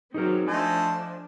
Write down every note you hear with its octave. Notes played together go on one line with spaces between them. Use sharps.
F#3 C4 D#4 G#4 A#4
F3 A3 D4 C5 D#5 G#5